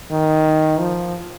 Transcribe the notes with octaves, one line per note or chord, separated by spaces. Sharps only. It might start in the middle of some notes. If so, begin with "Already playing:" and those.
D#3
F3